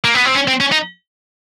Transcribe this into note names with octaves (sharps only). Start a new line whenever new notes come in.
A#3
B3
C4
C#4
C4
C#4
D#4